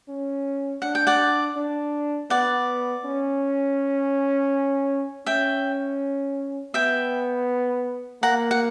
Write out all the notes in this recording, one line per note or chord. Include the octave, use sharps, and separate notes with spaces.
C#4
D4 F#5
G5
D5 F#5
D4
B3 D5 F#5
C#4
C#4 E5 G5
B3 E5 G5
A#3 F#5 A#5
F#5